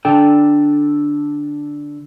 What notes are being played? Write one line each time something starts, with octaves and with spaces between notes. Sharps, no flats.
D3 D4 A4 G5